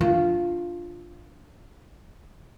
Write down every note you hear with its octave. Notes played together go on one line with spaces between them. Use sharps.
D4 F4